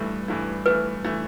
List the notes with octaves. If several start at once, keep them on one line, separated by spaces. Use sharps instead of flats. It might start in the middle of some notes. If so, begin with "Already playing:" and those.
Already playing: G2 E3 A3
G2 E3 A3
G2 E3 A3 B4
E3 A3